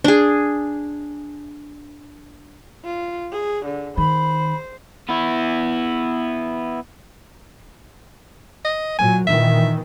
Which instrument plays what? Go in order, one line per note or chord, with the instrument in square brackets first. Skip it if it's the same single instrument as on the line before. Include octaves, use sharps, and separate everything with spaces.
[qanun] D4 G#4
[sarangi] F4
G#4
D3
[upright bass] D#3 [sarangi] C5 [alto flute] B5
[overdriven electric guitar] B3 E4
[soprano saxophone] D#5
[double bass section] A#2 F#3 [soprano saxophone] G#5
[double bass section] A#2 D#3 E3 [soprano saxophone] E5